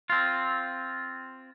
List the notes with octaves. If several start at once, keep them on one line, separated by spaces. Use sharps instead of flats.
C4 F4